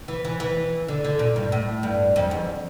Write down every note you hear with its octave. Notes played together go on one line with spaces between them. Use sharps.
E3
E3
E3
D3
D3
A#2
G2
A2
G2
F2
E2